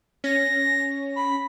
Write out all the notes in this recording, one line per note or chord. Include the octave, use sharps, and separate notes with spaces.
C#4 A#6
B5